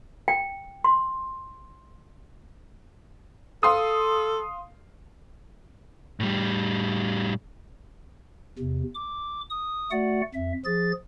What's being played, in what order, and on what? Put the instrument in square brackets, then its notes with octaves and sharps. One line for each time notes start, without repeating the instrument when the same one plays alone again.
[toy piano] G5
C6
[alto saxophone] A4 [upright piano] F5 C6 D#6
[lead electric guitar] A2 G3
[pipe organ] E2 C3
D6
D#6
A3 F#4 D5 F#5
F2 E5
F3 G#4 A6